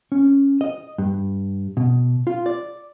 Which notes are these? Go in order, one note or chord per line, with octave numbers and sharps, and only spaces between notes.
C#4
D#5
G2
B2
F4
D5